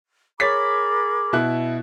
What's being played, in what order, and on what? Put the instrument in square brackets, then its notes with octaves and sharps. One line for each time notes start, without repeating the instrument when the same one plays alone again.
[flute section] G#4 A#4 B5 [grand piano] C#5 A6 B6 [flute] D6
[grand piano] B2 E4 F#6